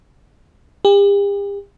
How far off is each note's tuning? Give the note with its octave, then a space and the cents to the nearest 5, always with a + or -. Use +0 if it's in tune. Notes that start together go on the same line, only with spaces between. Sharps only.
G4 +45